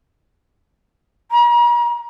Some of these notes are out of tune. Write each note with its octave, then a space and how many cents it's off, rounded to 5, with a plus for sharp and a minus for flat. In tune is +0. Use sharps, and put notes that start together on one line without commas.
A#5 +45